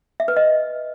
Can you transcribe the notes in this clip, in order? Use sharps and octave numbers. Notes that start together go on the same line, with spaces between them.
E5
B4
D#5